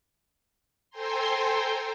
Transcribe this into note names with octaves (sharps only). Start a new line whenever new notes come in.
A4 C5 G5 G#5 A#5 C6